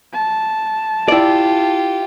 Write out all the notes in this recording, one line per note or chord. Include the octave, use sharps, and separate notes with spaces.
A5
E4 F4 G4 D5